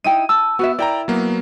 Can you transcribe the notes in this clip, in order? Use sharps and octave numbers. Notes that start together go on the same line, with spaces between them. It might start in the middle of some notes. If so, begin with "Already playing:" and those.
D#4 E4 G5 D#7
A5 E6
B3 F#4 B4 E5
E4 A#4 D5 G5 A#5
F#3 A#3 B3